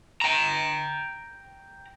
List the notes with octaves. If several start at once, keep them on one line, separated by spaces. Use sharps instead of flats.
G5 A#5